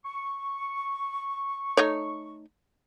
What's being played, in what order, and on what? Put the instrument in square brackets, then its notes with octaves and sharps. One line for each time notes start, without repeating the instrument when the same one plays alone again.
[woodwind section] C#6
[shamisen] A3 D#4 C#5